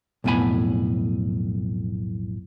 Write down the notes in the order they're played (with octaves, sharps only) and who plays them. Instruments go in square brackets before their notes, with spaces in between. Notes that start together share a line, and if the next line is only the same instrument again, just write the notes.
[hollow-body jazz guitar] B1 F2 A2 B3 G#5 B5